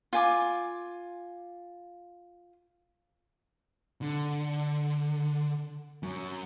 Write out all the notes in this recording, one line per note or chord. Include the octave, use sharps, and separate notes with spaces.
F4 G#5 D6
D3
F#2